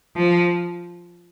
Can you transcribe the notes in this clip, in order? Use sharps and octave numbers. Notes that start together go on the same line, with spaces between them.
F3